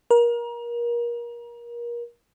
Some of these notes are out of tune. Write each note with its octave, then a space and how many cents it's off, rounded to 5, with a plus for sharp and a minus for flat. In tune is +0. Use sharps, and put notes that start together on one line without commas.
A#4 +30